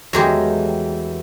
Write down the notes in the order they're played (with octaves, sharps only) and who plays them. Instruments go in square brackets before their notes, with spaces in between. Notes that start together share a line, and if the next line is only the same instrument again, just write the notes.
[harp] E2 A3 A#4 [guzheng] F#3 G#3 G4